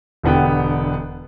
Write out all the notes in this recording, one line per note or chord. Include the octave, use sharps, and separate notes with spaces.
E1 D3 B3 G4 G5